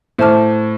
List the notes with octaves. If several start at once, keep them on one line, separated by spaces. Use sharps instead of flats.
A2 C5 E5 A5 D6 F6